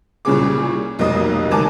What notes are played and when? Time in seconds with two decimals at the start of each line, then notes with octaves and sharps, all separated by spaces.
0.25 C2 A#2 C#3 C#4 G#4 D6
0.99 F1 B1 C3 A#3 D#5 D#6
1.51 C#2 D#3 A#4 G#5 A5 D6